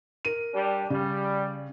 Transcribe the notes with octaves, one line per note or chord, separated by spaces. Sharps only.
A#4 D#7
G3 D4 G4
C#3 G3